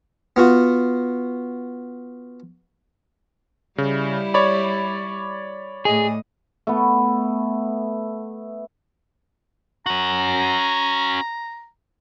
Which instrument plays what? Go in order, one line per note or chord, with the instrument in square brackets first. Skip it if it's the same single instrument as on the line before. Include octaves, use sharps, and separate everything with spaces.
[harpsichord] B3 F4 F#4
[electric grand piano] C#3 [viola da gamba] G3 E4
[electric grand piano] C#5 D5 B5
[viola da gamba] A2 D#5 [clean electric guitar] G#4
[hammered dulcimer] A3 B3
[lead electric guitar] C#4 F#4 [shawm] A#5